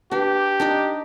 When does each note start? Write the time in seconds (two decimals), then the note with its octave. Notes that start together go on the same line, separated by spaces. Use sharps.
0.11 D4 G4 B4
0.60 D4 D#4 D#5